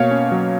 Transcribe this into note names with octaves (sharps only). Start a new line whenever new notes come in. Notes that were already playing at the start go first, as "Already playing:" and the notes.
Already playing: B2 A#3 C#5 F5
C#4
F#3